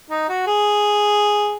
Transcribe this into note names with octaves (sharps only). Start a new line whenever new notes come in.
D#4
F#4
G#4